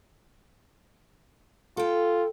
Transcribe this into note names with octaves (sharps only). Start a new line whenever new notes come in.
F4 A4 G5